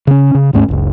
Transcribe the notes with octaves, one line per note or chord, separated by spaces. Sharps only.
C#3 C#4
C#3
D#2 G#2 A3 C#4
F#1 C#2